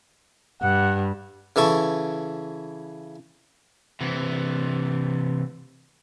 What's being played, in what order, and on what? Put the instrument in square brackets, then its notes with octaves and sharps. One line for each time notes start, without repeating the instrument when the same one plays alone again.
[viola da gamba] G2 [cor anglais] F#5
[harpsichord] C#3 E3 A4 C#6
[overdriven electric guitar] C3 E3